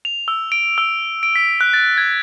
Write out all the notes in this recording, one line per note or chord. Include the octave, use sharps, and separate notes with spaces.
F7
E6
D7
E6
D7
B6
F#6
A6
G#6